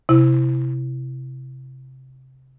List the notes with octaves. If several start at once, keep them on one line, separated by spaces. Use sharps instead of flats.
C3 E4